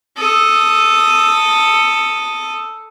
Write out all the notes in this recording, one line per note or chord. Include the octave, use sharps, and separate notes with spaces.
A4 D#6